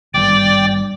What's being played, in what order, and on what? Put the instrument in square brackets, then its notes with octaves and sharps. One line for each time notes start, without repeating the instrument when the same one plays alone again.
[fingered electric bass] G#1 G2 [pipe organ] D5 G5 D6